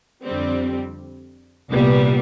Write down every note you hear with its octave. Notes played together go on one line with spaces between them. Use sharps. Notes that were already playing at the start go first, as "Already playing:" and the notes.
F2 D3 G3 C4
C2 A#2 G3 B3